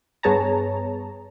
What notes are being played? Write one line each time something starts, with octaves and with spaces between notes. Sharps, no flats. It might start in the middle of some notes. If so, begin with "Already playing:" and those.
G2 B3 G#4 C#5 A5 A#5